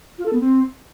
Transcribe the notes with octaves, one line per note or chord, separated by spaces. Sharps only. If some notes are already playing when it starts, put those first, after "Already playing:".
F4
A4
B3
C4